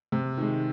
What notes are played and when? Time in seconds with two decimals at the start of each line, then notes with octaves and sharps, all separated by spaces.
0.12 C3
0.38 D#3 G#3